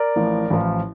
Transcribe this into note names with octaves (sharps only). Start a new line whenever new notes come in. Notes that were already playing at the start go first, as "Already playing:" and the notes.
Already playing: A#4 D5
A1 A2 F3
A1 A2 F3